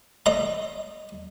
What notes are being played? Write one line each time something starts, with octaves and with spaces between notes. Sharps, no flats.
D#5 A#5